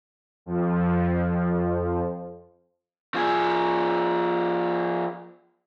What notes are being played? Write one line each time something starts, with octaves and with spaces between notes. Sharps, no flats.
F2 F3
F3 G#4